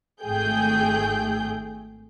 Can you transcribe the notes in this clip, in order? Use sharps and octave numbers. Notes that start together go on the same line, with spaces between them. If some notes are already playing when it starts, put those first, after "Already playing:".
G#1 A3 G#4 G5 G6